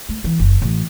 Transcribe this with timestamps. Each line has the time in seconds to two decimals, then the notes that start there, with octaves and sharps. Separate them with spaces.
0.09 A3
0.24 E3
0.39 F#1
0.62 A1